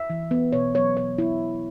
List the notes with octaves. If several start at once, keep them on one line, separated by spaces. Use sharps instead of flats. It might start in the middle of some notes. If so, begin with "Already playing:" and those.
Already playing: E5
E3
B3
B2 C#5
F#3 B3 C#5
B2 C#5
F#3 B3 E4